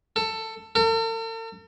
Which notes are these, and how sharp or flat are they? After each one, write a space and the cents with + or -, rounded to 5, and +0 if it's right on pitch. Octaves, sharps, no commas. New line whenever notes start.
A4 +15
A4 +45